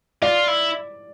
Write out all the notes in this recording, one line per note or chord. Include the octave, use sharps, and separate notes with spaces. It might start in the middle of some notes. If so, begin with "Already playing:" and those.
F4 D5
E4